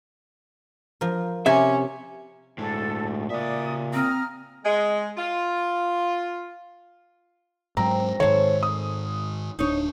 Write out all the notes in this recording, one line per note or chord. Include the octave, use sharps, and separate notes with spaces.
F3 A#4
C3 C#4 E5 G#5
D2 A2 G#3 A4
A#2 C#3 D5 E5 D#6
C4 A#5 D#6 F6
G#3
F4
G#2 F#3 C4 A#5
G#2 D#3 A4 C5 C#5
D#6
D1 C4 D4 D#4 C#5